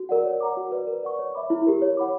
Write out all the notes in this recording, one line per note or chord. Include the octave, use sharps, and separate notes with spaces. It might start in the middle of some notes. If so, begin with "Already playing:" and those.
Already playing: F#4
A#4 D5 F#5
C#5
F#5 A#5 D6
F#4
B4 D5
A#4
D5 F#5 C#6
C#5
E5 B5 D6
E4
G4 A#4
C#5
F#5 B5 D6